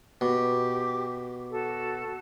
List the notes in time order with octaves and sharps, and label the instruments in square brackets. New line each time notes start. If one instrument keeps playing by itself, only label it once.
[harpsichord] B2 [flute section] G4 D6
[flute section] F#4 A4